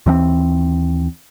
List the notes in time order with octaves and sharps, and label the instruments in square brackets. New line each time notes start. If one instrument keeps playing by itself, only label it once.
[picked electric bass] D#2 E3 G#3 C4